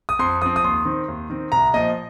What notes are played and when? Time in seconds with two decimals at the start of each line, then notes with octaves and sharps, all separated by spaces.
0.09 D#6
0.19 F2 C6
0.42 F3 C4 D#6
0.56 D#6
0.64 D#2 C6
0.85 D#3 C4
1.08 D#2
1.30 D#3 C4
1.52 C2 A#5
1.74 A#2 F3 D#5